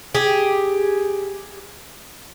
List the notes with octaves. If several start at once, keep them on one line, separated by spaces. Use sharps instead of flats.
G4 G#4